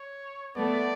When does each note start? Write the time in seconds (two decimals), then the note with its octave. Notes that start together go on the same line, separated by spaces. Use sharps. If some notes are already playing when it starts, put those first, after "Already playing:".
Already playing: C#5
0.55 A3 B3 D5